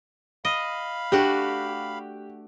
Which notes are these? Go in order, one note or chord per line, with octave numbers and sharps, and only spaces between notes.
D#5 F5 B5
A3 D4 F#4 G4